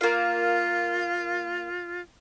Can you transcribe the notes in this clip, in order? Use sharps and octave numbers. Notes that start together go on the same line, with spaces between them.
A#3 F4 F5